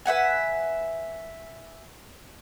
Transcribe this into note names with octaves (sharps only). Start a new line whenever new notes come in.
B4 E5 F#5 G#5